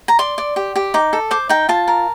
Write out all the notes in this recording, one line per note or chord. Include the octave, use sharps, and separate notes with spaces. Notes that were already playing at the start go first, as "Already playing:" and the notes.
A#5
D5 C6
D5
G4
G4
D#4 D6
A4
C5 D6
D#4 G5
F4 A5
A#4